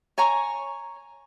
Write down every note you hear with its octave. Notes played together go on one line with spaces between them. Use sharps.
C#5 G#5 A#5 C#6